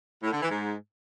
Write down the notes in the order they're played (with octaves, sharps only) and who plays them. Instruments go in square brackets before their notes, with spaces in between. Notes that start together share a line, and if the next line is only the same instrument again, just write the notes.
[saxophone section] A2
D3
E3
G#2